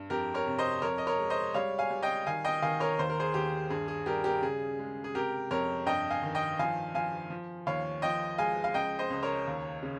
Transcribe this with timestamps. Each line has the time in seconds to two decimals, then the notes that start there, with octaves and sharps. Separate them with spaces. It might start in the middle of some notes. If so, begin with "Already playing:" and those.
Already playing: G2
0.10 F2 G4 A#4
0.34 A#4 C#5
0.47 C3
0.58 C5 D#5
0.82 F2 A#4 C#5
0.98 D#5
1.07 A#4 C#5
1.19 G#3
1.30 C5 D#5
1.54 G3 C#5 F5
1.79 F5 G#5
1.90 G3
2.03 D#5 G5
2.27 D#3 F5 G#5
2.45 D#5 G5
2.62 D#3 F5 G#5
2.80 A#4 C#5
2.99 D#2 C5
3.10 A#4
3.20 G#4 C5
3.34 D#2 G4
3.70 G2 G#4
3.88 G#4
4.06 G3 G4 A#4
4.24 G4 A#4
4.42 C#3 G#4
4.79 G#3
5.04 G#4
5.15 C3 G4 A#4
5.51 F2 A#4 C#5
5.86 G2 D#5 G5
6.10 F5 G#5
6.23 D#3
6.35 D#5 G5
6.59 F3 F5 G#5
6.94 F3 F5 G#5
7.30 F3
7.66 D#2 C#5 F5
8.02 F3 D#5 G5
8.38 G#3 F5 G#5
8.64 F5
8.74 C#2 D#5 G5
8.99 C5 D#5
9.10 C#2
9.23 A#4 C#5
9.47 D#2
9.83 C#3